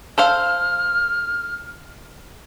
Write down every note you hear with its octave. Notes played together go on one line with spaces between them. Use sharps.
A4 C5 F5 F6